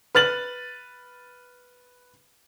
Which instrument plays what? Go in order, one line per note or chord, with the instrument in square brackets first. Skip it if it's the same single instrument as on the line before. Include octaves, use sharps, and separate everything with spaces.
[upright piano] B4 F6 A6 F#7